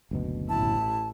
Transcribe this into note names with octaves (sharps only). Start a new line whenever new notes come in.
F#1 D2 B2
A1 E4 A5